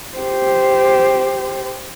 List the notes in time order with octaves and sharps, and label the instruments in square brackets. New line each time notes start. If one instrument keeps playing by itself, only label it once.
[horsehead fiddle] G4 C5